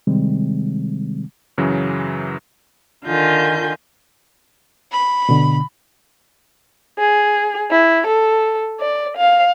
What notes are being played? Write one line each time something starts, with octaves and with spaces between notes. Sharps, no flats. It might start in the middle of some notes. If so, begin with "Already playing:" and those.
C3 D#3 G3 G#3 C4
F#2 C#3 E3 F#3
D3 D#3 F4 G#5 G6
B5
B2 D3
G#4
E4
A4
D5
F5